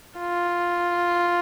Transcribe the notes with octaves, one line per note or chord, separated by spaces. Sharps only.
F4